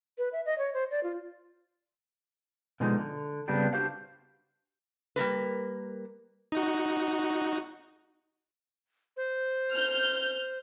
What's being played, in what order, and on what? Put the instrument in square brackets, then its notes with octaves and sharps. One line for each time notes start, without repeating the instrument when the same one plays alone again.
[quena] B4
E5
D#5
C#5
C5
D5
F4
[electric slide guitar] B2 D3 F3 G#3 D#4
D3
C#3 G3 B3 C4 D4 G4
D4 F#4 G4 C5 F5
[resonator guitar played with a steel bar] G3 A#3 A#4 B4
[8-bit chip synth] D#4 F#4
[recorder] C5
[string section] F6 G6